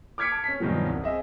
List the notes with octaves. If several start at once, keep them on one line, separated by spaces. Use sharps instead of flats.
D6 F6 G#6 B6 C#7 D7
A5
C#4 B6
E2 G2 B2 D#3 F3 F#3
C2
C4 G#4 D#5 E5